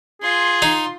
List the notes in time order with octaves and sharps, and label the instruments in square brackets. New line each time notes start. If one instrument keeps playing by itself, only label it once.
[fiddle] F4 C6 [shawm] G#4
[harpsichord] D#4